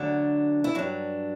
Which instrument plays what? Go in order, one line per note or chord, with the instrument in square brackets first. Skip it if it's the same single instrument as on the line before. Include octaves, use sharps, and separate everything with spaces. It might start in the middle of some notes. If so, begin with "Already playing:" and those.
Already playing: [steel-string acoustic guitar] D2 D3 F#3 D4
E4
G2 F#3 D4